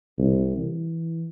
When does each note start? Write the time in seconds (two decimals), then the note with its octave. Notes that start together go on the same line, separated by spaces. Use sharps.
0.18 C2
0.58 E3